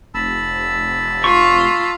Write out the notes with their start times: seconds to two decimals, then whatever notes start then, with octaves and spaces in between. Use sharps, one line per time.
0.14 F1 A5 B5 E6
1.24 F4 C#6